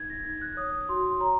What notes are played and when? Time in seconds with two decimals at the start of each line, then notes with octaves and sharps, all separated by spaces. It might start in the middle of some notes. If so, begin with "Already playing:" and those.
Already playing: D#4 G#6
0.10 A#6
0.25 D#4 G#6
0.42 F#6
0.57 C#5 D#6
0.89 F#4 C6
1.21 C#5 A#5